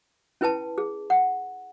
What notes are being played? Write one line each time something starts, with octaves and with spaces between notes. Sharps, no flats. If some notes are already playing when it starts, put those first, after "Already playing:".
C#4 E4 B4 G5 A5
G#4
F#5